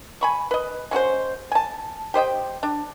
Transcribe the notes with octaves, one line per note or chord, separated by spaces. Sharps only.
G#5 B5 C#6
B4 D#5
G#3 C#4 F#4 C5
G#5 A5
G4 C5 D#5 G5
D4